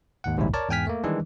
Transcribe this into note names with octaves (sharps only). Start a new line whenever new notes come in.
D#2 G#2 F#5
A#1 D#2 G#2 C3 G3 E4
A#4 C#5 D5 A5
E2 G#2 G5 G#5 F6 B6
A3 A#3
D#3 E3 G3 G#3 D4